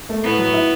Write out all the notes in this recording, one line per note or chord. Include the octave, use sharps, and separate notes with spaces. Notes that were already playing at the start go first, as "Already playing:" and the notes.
A3
A2 B3
F#3
E4